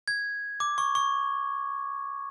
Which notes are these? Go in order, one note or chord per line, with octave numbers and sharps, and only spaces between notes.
G#6
D6
C#6
C#6